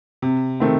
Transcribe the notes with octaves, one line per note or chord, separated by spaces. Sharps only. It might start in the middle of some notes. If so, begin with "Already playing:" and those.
C3
D#3 A3 C4